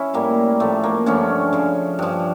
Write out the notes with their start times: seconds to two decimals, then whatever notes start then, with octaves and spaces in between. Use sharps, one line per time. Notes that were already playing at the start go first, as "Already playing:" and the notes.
Already playing: C#4 E4
0.14 A2 G3 A#3
0.60 A2 F3 A3
0.84 A#3
1.06 G2 D3 F3 A3 C#4
1.53 C#3 F3
1.99 G2 F3